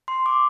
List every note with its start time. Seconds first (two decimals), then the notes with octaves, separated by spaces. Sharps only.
0.08 C6
0.26 D6